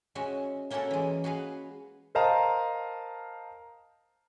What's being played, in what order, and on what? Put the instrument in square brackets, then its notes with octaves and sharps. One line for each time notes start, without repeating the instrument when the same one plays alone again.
[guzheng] G#3 C#4 F#4 E5
A#3 C#4 E4 F#4 A4 A#4
E3 G#3
F#4 G#4 B4 F5
[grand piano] A#4 C5 D#5 F5 A5 A#5